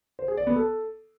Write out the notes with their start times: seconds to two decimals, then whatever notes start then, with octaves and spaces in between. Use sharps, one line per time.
0.19 C5
0.28 G#4
0.37 D5
0.47 B3
0.56 A4